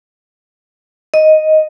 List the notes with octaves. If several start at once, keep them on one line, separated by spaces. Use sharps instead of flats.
D#5